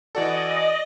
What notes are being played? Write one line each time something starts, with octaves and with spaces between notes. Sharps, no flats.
E3 F#4 A4 D5 D#5